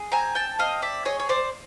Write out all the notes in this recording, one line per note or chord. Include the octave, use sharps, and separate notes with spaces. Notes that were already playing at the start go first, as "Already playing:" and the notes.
Already playing: G#4
C4 G#5 A#5
G5 A5
C4 D#5 F5
D5 E5
G#4 C#5 D#5
C#5
C5 D5